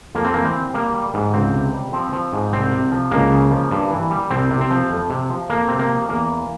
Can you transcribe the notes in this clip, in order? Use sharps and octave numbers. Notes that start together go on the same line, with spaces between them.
F2 A#3
C4
E3 A#3
C4
G3
G3 A#3
G3
G#2
C#2 C4
C3
G3
F3 C4
F3
G#2
C2 C4
C3
F3
C#2 A#3
C#3
F3
G2
E3
G3
C2 C4
C3
C4
F3
F2
C3
F3
F2 A#3
C3 C4
A#3
F3
E2 A#3
E3